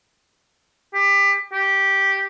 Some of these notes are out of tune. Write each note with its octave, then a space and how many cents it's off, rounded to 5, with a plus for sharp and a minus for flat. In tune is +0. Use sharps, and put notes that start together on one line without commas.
G4 +25
G4 -5